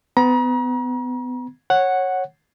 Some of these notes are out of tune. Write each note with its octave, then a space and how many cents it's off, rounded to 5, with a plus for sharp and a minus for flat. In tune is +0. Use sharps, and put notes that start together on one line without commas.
B3 +30 A#5 +40
C#5 -15 F#5 +0